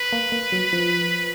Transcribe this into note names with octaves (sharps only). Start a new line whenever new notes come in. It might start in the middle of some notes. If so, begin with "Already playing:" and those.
Already playing: B4
A#3
A#3
F#3
F3